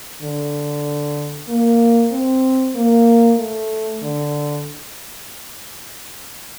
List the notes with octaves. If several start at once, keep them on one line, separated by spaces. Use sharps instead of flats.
D3
A#3
C4
A#3
A3
D3